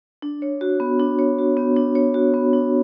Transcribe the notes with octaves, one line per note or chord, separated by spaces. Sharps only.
D4
C#5
F#4
B3
D4
C#5
F#4
B3
D4
C#5
F#4
B3
D4